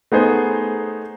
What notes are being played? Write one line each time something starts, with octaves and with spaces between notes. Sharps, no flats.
A3 B3 D#4 G#4 C5